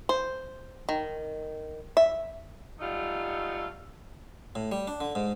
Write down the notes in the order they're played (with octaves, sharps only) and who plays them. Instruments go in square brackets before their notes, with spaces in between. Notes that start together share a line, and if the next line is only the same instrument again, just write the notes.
[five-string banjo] C5
D#3
E5
[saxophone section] F#3 G3 A3 D#4 F4
[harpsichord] A2
G3
D4
D3
G#2